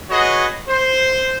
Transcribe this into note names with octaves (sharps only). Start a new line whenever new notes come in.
F#4 G#4 B4 C#5 D#5 F#5
C5